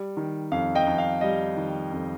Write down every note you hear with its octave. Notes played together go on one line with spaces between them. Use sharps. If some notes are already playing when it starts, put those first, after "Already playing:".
Already playing: G3
D#3
F2 F5
D#5 G5
F2
F5
G3 D#5
D#3
F2